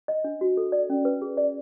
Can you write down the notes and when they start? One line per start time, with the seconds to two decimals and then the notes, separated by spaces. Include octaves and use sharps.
0.08 D#5
0.24 D4
0.41 F#4
0.57 A4
0.72 D5
0.90 C#4
1.05 B4
1.22 G#4
1.37 D5